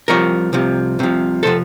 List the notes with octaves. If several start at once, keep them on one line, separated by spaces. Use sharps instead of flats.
C2 C3 F3 A#4 C#5
C2 C3 F3
C2 C3 F3
C3 F3 A4 C5